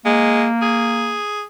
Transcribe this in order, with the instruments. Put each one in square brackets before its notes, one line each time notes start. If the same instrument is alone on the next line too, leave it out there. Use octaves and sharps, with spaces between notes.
[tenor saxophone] G#3 [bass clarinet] A#3
[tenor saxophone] G#4